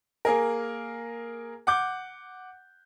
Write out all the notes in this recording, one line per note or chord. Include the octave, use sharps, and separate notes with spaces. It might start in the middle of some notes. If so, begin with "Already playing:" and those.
A#3 G#4 A#4
F#5 D6 G6